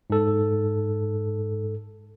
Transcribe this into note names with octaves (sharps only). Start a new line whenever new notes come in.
G#2 A4